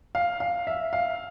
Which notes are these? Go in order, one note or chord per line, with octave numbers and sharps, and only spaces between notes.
F5
F5
E5
F5